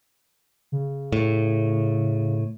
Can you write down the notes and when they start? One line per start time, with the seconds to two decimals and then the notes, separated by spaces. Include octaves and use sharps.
0.72 C#3
1.13 A2